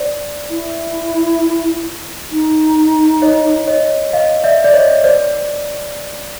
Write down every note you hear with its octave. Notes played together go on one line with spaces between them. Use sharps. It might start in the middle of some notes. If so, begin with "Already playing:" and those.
Already playing: C5 D5
E4
D#4
C#5 D#5
C#5 D#5
D#5 F5
D5 E5
D5
C#5 D#5
C5 D5